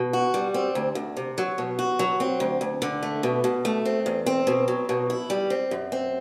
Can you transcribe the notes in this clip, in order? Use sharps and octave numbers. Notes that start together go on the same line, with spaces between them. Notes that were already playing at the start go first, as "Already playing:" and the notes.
Already playing: B2
F#4
G3
C4
D2
D2
C3
F#3
B2
F#4
F#3
C4
D2
D2
D3
A3
B2
B2
A3
C4
E2
C4
B2
F#3
B2
E4
G3
C4
F#2
C4